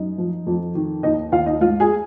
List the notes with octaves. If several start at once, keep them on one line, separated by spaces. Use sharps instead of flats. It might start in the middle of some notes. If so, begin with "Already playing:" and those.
Already playing: F#2 D#4 D#5
F3
F2
D#3
D#2 D#4 D#5
D#2 F4 F5
D#4 D#5
G#2 F4 F5
G#4 G#5